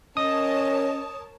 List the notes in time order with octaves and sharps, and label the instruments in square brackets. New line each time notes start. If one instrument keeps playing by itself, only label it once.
[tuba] C#4 [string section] A#4 C#5 A5 [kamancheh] D#5 [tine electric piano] D#6